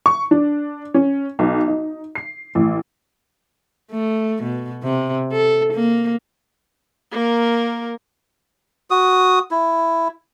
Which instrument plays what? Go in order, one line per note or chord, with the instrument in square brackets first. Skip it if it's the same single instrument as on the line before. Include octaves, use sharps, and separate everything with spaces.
[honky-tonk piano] C#6
D4
C#4
B1
D#4
C7
A1
[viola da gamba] A3
B2
C3
A4
A#3
[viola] A#3 A#4
[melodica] F#4 D#6
E4